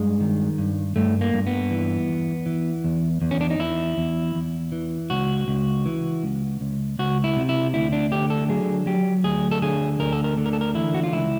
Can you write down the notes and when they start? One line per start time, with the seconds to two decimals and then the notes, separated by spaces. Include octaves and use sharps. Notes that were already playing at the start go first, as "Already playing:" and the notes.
Already playing: G2 G#3
0.21 D#3
0.58 G2
0.96 G2 A3
1.21 A#3
1.34 G2
1.47 B3
1.71 E3
2.09 E2
2.46 E3
2.84 E2
3.22 E2
3.31 C#4
3.41 D4
3.50 D#4
3.59 E2 E4
3.98 E2
4.35 E2
4.72 E3
5.10 C#2 F#4
5.48 C#2
5.86 E3
6.24 C#2
6.61 C#2
6.99 C#2 F#4
7.24 E4
7.37 C3
7.49 E4
7.74 D2 E4
7.92 D4
8.11 D3 G4
8.30 A4
8.49 F#3 G#4
8.87 F#3 G4
9.24 D2 G#4
9.51 A4
9.62 D3 G#4
10.00 D2 A#4
10.13 A4
10.24 A#4
10.38 D3
10.46 A#4
10.53 A4
10.61 A#4
10.75 E3 E4
10.94 F#4
11.04 F4
11.13 C#2 E4